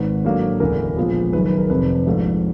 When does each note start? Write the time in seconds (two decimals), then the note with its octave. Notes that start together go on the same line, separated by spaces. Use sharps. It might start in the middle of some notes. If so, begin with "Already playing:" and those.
Already playing: G#1 G#2 D#3 B4
0.24 A2 F#3 A#3 D4
0.60 E1 D2 C#3 E3 A#4
0.96 A#1 A#2 F3 G#3 B3
1.33 F#1 F#2 D#3 B4
1.46 B4
1.58 A#4
1.70 F1 F2 C3 B4
2.07 A#1 G#2 F3 A3